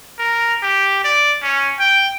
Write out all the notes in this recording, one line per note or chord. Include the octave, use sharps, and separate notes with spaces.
A#4
G4
D5
C#4
G5